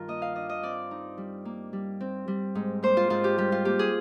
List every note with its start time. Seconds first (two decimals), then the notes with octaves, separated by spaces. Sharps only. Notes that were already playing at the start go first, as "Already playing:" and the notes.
Already playing: G2 D#3 F4 A#4
0.08 A#3 D#5
0.22 F5
0.36 D4 D#5
0.49 D#5
0.63 C4 D5
0.91 D#4
1.18 G3
1.45 A#3
1.73 G3
2.01 C4
2.28 G3
2.55 G#2
2.83 A#3 C5
2.97 F4
3.10 G#2 F4
3.24 G4
3.38 G3 G4
3.52 F4
3.65 A#3 G4
3.79 G#4